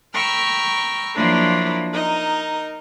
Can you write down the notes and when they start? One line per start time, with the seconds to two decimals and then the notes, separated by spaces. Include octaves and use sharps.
0.14 G5 A#5 B5 C#6 E6 F6
1.15 F3 F#3 A#3 D4 E4 F4
1.91 D#4 A#4 D#5